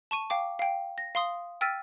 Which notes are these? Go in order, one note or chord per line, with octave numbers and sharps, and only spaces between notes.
A5 C#6 D#7
F5 G5 D6
F5 G5
A#6
F5 C6 D#6
G5 E6 F6 A6 B6 D#7